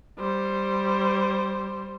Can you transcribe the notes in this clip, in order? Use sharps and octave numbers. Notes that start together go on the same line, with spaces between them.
G3 C5